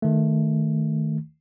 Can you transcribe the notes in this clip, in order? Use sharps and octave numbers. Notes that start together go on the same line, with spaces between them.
D#3 A3